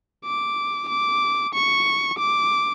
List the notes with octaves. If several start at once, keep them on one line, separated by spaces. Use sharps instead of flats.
D6
D6
C#6
D6